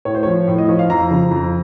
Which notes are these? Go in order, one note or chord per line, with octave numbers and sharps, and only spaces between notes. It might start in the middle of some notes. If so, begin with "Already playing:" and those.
A2 C#5
C5
F3 C#5
A2
D#5
F3 C#5
F5
F2 A#5
C#3 F3
F2